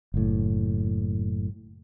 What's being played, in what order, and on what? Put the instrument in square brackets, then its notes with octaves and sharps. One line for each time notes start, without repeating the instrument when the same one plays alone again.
[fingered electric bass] F#1 A2